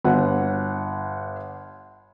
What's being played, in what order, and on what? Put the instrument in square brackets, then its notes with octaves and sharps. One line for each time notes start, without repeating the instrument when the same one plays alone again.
[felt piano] G1 F#5